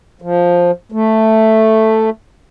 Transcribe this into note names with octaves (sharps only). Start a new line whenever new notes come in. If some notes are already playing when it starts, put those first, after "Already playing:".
F3
A3